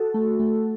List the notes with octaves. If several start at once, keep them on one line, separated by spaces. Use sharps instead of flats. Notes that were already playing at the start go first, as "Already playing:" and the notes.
Already playing: F#4 A4
A3
A3